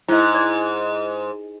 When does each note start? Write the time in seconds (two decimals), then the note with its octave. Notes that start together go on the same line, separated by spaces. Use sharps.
0.08 G#2 E4 D#5
0.35 D5